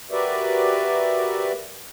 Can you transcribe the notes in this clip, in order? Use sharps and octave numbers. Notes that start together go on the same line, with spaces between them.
F#4 G4 A#4 B4 D5 E5